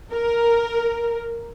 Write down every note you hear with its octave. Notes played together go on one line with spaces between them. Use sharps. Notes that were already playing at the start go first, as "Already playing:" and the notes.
A#4